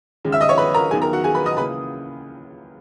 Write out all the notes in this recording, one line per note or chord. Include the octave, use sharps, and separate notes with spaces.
D#2 C#3 G#3
E5 E6
D#5 D#6
C#5 C#6
B4 B5
A#4 A#5
D#2 D#3 F#3 B3 G#4 G#5
A#4 A#5
F#4 F#5
G#4 G#5
B4 B5
D#5 D#6
C#2 C#3 E3 A#3 B4 B5